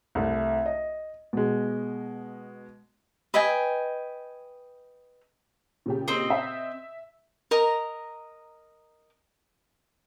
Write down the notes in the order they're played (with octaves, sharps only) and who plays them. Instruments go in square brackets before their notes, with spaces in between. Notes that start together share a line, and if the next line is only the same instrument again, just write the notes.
[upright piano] C2 A3
D#5
B2 G#3
[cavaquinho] B4 D#5 G5 G#5
[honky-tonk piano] A#2 C#3 G4
[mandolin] C4 D#5
[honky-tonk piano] E5
[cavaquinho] A#4 D#5 A#5